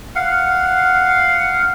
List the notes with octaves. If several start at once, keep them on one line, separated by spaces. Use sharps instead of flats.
F5 F#5